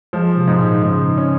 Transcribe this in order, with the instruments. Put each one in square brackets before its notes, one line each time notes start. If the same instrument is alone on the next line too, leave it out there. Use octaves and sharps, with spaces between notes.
[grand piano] F3 [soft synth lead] G#3
[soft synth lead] C3
[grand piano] G#2
[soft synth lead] A#2
[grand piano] G#2 [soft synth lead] C#3
[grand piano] C#4